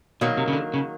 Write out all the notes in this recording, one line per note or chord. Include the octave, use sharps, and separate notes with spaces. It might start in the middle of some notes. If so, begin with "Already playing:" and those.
B2 D#3 F#3 A#3
C3
C#3
D3
C#3